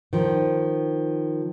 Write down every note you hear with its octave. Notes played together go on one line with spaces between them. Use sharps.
D#3 F3